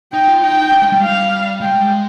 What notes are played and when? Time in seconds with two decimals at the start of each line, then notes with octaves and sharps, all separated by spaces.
0.12 D#4 G5
0.28 F4
0.43 D#4 G5
0.72 D4
0.82 G#3
0.92 G3
1.02 F5
1.61 G#3 G5